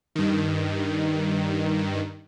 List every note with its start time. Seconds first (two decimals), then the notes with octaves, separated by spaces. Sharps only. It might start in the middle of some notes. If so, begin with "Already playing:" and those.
0.16 G2 D#3